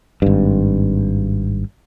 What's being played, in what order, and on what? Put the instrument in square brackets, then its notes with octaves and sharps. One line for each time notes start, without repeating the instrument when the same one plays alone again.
[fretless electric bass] G#1 G2